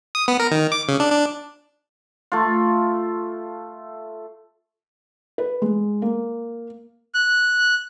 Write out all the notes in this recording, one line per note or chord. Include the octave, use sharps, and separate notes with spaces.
D#6
B3
A#4
D#3
D6
C#3
D4
D4
A3 F4
B4
G#3
A#3
F#6